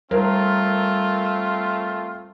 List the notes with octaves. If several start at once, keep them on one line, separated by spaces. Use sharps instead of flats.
G3 A3 C4 F4 A#4